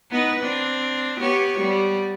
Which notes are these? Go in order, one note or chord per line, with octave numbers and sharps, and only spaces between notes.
B3 D#4 B4
C4 D4
B3 G4 C#5
G3 B3